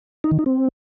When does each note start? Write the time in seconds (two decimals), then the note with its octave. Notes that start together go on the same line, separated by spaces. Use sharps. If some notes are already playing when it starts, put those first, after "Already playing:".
0.24 D#4
0.31 D#3
0.39 D#4
0.46 C4